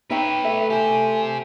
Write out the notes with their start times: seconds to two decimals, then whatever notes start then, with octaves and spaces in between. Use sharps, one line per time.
0.10 D#4 B4 C#5 E5 G5
0.45 A3 E5
0.70 G4 C5 G#5